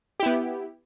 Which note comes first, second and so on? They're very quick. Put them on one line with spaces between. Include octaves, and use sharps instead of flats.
G4 E4 B3